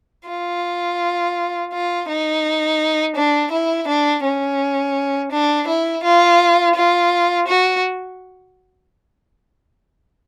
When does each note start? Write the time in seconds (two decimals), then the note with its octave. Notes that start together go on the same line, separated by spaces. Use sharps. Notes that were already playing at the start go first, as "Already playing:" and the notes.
0.28 F4
1.73 F4
2.08 D#4
3.15 D4
3.51 E4
3.87 D4
4.24 C#4
5.31 D4
5.67 E4
6.03 F4
6.75 F4
7.47 F#4